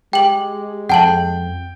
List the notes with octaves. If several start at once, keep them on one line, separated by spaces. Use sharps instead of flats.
G#3 G4 G5 F#7
F2 F#5 G5 A5 F#7